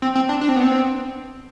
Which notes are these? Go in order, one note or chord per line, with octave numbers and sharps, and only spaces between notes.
C4
C4
D4
D4
C4
B3
C4